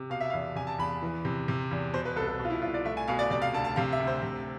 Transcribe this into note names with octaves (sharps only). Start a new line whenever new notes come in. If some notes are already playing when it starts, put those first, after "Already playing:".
Already playing: C3
B2 F5
E5
F5
E2
C3 G#5
A5
E2 B5
E3
C3
C3
E2
B2 C5
B4
C2 A4
A4
B2
F4
E4
C2 F4
D5
A3 E5
G#5
B2 F5
D5
C3 D5
F5
D2 A5
A5
C3 F5
E5
D2
C5
C3